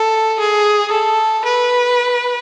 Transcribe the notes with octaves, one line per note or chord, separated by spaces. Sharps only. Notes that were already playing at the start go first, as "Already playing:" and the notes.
Already playing: A4
G#4
A4
B4